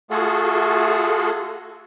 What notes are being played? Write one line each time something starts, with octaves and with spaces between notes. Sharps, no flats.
A3 F4 F#4 G#4 A4